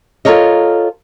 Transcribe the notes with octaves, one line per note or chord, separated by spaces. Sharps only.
F4 F#4 A4 A#4 C#5 D#5